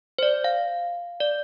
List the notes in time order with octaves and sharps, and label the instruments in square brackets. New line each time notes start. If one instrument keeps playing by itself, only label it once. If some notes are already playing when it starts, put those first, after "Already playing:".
[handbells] C5
D5
F5
D5